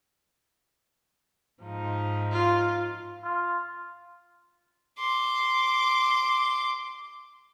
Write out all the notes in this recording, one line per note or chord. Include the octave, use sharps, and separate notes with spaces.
G#2 F3 D#4
F4
F4
C6 D6